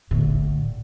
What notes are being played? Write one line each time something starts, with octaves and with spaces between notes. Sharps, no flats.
A2 D3